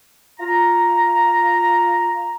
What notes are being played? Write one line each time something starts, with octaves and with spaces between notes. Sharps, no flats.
F4 A#5